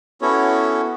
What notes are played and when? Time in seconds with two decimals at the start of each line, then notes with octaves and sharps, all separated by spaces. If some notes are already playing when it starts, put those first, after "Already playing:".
0.22 B3 C#4 E4 F#4 A4 C#5